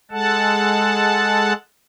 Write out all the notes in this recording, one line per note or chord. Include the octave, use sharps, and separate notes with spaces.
G#3 A4 F#5 A5